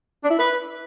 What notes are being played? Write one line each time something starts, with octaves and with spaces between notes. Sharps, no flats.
D4
E4
B4